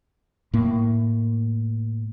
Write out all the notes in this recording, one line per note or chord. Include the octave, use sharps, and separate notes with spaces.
A2 A#3